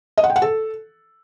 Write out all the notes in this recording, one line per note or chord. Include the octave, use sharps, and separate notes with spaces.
D#5
F#5
G5
F#5
A4